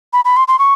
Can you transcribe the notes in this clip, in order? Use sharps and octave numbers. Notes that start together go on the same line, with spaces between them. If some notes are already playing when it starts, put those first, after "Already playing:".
B5
B5
C6
C6
C#6